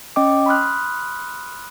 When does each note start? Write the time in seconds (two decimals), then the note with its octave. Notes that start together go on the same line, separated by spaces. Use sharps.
0.16 C#4 D#5 G5 D6
0.46 B5 C6 D#6 F6 F#6